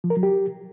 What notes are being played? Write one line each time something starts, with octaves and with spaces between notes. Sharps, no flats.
F3
A#4
F#3
G4